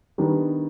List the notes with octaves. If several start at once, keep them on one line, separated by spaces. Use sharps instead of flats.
D#3 G3 B3 D4